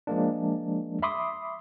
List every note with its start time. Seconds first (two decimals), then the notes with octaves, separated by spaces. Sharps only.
0.07 F3 G#3 A#3 D4
1.02 E5 B5 C6 D6 D#6